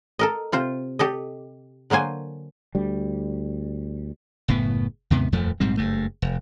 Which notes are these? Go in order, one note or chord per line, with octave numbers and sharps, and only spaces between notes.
A4 A#4 D#5
C3 F4 C5
G4 A4 D#5
D3 F#3 A#3 C5 G#5
D2 G3
F#1 A2 B3
D#2 G#2 C3 B3
D#1 F2 F3 A3
A#1 G#2 G3 C4
F#1 G2 A3
F1